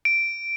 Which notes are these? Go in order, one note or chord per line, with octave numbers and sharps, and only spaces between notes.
D7